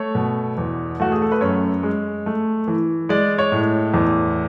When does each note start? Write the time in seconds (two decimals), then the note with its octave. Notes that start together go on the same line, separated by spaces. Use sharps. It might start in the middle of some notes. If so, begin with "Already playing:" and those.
Already playing: A3 C#5
0.15 B2
0.58 E2
1.00 A3 F#4
1.12 G#4
1.22 A4
1.32 B4
1.41 F#2 C#5
1.83 G#3
2.26 A3
2.68 E3
3.09 G#3 D5
3.38 C#5
3.52 A2
3.94 E2